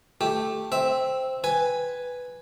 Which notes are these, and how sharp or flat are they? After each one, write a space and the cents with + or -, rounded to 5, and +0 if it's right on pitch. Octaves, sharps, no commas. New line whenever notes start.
A3 +0 G4 +0
C4 +0 E5 +0
B4 +0 G#5 +0